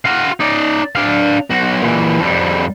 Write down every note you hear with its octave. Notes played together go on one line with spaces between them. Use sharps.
F#4 F5
D#4 D5
D4 F5
B1 F#4
A#2 E3
F2 G3